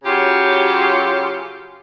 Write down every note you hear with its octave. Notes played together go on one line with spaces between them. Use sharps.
C#3 F#3 F4 G4